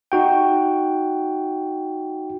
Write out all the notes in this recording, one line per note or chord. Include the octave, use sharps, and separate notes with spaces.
D#4 F#4 G5